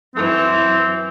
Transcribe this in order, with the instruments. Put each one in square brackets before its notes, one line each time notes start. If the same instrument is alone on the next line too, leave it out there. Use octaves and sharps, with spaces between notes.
[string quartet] F#2 E3 [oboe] C4